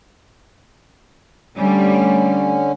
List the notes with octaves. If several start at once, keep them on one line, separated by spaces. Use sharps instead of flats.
D3 G3 A3 C#4